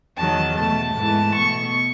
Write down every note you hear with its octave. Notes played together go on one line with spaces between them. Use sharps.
E2 D#3 F#3 A5
B2 A3 A5
G#2 E3 A3
B2 A3 C#6